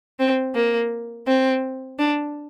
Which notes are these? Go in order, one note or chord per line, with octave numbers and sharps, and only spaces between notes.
C4
A#3
C4
D4